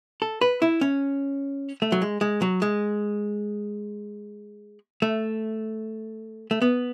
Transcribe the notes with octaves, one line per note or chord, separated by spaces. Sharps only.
A4
B4
E4
C#4
A3
F#3
G#3
G#3
F#3
G#3
A3
A3
B3